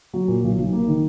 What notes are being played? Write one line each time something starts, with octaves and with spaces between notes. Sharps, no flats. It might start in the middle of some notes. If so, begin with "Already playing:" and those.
F#3
A#2
B1
B1
A#3
D#3